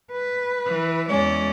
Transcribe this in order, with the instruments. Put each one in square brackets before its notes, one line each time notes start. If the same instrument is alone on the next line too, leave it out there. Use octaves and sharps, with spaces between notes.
[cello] B4
[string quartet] E3
[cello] E2 D5 [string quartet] G#3 C#4